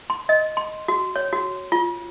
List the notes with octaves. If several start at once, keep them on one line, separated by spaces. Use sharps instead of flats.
C6
D#5
C6
F#4
C#5
F#4
F4